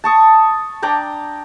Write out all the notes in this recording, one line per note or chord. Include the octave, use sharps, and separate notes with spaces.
A5 C#6 D#6
D4 G5 A#5 D6